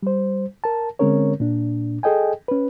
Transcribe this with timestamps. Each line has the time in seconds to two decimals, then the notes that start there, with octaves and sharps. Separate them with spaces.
0.03 G3 C5
0.64 A#4 A5
0.99 D3 G#3 C4 C#4 A#4 C#5
1.40 A#2 D4
2.03 G#4 A4 D#5 G5 G#5
2.48 C#4 B4